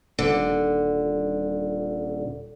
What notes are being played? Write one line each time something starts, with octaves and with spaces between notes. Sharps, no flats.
D#1 D3